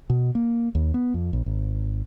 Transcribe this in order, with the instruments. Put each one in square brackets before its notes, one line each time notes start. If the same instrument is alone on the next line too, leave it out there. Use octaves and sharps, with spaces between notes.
[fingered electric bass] B2
A#3
D#2
B3
F2
A#1
G#1